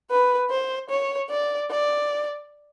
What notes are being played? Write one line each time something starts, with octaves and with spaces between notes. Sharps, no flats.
B4
C5
C#5
D5
D5